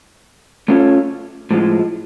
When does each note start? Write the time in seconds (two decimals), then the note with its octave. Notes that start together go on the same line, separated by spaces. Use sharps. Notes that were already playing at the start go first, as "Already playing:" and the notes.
0.68 A3 C#4 F4 A4 C#5
1.51 A2 F3 G#3